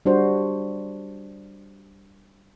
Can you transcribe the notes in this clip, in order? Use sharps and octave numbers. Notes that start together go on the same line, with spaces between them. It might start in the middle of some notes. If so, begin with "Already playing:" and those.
G3 D4 F#4 C5